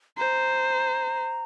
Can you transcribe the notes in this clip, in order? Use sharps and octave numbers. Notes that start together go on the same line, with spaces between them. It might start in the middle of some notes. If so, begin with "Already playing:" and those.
C5 A#5